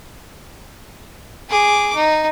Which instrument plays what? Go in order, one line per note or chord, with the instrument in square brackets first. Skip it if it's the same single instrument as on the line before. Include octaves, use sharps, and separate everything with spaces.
[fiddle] G#4 D6
D#4